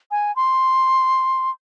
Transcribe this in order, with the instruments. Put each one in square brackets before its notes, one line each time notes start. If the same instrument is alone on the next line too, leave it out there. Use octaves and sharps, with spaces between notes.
[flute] G#5
C6